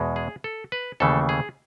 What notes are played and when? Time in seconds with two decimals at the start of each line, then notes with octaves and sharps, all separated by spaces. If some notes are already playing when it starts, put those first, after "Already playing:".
Already playing: E2 B2 G#3
0.16 G#4
0.44 A4
0.72 B4
1.00 D#2 C#3 E3 A3 A4
1.29 G#4